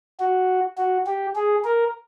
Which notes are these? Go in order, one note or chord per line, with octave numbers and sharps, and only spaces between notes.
F#4
F#4
G4
G#4
A#4